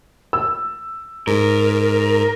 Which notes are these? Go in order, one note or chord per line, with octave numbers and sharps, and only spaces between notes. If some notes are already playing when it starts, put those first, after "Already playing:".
E6
G#2 A#4